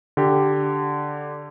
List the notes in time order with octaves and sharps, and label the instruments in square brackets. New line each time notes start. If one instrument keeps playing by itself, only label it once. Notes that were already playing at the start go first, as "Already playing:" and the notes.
[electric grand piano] D3 G4